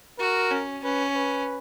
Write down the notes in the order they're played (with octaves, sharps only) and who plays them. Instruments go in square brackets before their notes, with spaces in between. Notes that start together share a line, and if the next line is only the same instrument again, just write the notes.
[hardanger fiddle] F#4 [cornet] A#4
[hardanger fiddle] C#4
[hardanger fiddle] C#4 [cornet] B4
[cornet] B4